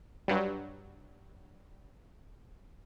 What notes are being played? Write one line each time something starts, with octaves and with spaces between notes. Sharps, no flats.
G2 F#3 G3